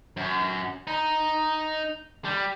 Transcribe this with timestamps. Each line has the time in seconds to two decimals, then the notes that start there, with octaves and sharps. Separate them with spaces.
0.17 F#2
0.87 D#4
2.25 G3